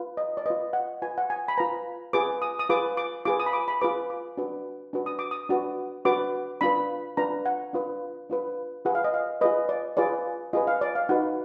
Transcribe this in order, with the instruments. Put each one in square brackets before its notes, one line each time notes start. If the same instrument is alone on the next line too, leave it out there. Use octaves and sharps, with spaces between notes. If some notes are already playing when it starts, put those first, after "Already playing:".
Already playing: [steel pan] F4 B4
D#5
D5
B4 D#5
F4
F#5
F4 B4 G#5
F#5
G#5
B5
F4 B4 A#5
F4 G#4 B4 D6
D#6
D#6
F4 G#4 B4 D6
D6
F4 G#4 B4 D6
D#6
B5
D6
B5
F4 G#4 B4 D6
D6
D4 F#4 B4
D4 F#4 B4
D#6
D6
D#6
D4 F#4 B4
D4 F#4 B4 D6
D4 F4 B4 B5
D4 F4 B4 A#5
F#5
D4 F4 B4
D4 F4 B4
F4 G#4 B4 F#5
F5
D#5
F5
F4 G#4 B4 D#5
D5
F4 G#4 B4 D5
F4 G#4 B4 D#5
F5
D5
F5
D#4 F#4 B4 F#5